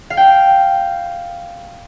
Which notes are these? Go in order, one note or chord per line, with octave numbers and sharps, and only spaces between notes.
F5
G5